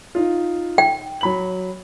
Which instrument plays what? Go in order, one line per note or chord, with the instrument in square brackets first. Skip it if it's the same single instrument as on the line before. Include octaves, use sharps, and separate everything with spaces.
[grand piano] D#4 F4
[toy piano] G5
[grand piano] F#3 B5 F#7